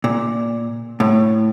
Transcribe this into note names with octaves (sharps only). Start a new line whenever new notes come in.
A#2
A2